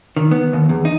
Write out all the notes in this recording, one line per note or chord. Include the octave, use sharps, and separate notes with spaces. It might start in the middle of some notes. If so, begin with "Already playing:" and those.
D#3
B3
D#2
E2
D#4